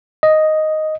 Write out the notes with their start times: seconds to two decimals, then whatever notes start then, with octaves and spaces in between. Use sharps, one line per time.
0.23 D#5